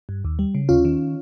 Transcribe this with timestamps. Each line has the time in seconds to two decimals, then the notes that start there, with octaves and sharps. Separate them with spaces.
0.09 G2
0.25 D#2
0.39 G3
0.55 C#3
0.69 D#2 C#4 F4
0.85 D#3